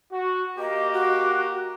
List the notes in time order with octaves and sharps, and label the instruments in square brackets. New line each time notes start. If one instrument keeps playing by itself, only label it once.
[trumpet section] F#4
[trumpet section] A#3 G4 A#5 [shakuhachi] D#5
[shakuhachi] F#4